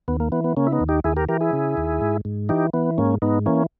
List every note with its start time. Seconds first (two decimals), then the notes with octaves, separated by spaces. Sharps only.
0.08 D#2 B3
0.20 A#3
0.32 E3 B3
0.44 B3
0.57 C#3 A#3 C#4
0.67 E4
0.72 B3 D#4
0.80 D#2
0.89 D#4 G4
1.04 D#2 E4 G#4
1.16 G4 A#4
1.29 E3 G4 A#4
1.41 E4 G#4
1.53 C#3
1.77 D#2
2.01 G#2
2.25 G#2
2.49 E3 D#4 G4
2.73 E3 B3
2.98 G#2 A#3 C#4
3.22 G#2 B3 D#4
3.46 E3 A#3 C#4